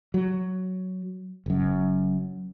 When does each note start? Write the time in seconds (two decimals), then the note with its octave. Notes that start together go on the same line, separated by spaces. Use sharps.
0.14 F#3
1.46 F#1 F#2